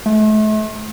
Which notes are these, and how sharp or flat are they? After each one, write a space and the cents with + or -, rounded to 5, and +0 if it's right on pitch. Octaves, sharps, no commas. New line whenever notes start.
A3 -40